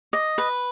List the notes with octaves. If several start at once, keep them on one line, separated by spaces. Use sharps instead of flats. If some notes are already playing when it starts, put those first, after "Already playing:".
D#5
B4